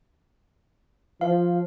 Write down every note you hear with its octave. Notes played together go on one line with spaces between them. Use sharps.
F3 F5